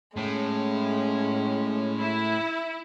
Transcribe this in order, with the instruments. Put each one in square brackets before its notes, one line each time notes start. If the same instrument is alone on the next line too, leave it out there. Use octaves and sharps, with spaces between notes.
[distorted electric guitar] A2 [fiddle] G#3 C#4
[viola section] E4